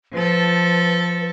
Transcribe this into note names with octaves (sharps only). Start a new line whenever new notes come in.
F3 A4 B4